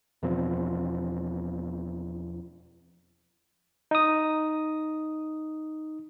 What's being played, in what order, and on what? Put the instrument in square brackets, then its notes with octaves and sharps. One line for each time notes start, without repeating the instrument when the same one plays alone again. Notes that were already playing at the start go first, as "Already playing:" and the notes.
[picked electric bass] E2 B2 F3 C4
[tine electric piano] D#4 D#6